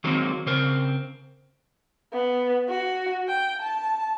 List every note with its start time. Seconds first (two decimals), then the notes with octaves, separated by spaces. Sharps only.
0.04 D#3 F#3 G#3 A#3 C4 D#4
0.46 C#3 C4 A#4
2.13 B3
2.69 F#4
3.28 G5
3.62 A5